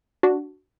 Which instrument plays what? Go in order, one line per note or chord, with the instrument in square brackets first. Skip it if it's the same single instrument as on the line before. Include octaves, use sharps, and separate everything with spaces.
[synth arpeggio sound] D4 F#4